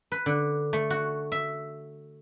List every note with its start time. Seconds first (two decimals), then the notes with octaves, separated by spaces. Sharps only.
0.12 B4
0.26 D3
0.73 A3
0.90 F#4
1.32 E5